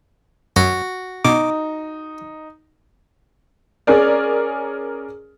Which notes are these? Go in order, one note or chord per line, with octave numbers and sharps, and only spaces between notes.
F#2 F#4
B2 D#4 D6
C#4 G#4 A#4 D5